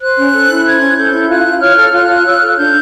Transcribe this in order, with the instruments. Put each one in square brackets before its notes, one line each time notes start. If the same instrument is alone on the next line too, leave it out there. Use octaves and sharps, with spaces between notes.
[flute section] C5 F#6
C#4
A4
E4
C5 G#6
C#4
A4 G6
E4
F4 F#6
F4
C#5 F6
A4
F4 F#6
F4
C#5 E6
A4 F6
F#6
D4 G6